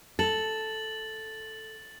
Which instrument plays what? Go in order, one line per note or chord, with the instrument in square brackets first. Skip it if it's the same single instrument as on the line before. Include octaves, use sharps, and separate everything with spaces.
[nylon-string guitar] A4 [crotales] A6 F#7